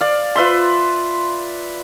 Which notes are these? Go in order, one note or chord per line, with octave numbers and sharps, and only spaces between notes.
D5 F5
F4 B4 E5 C6